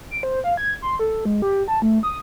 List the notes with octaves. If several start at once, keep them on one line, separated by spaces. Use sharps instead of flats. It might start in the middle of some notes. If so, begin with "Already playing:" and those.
D7
C5
F5
G#6
C6
A4
G#3
G4
A5
A3
D#6